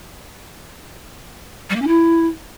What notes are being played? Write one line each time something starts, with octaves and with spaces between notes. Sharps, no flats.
G3
A#3
C#4
E4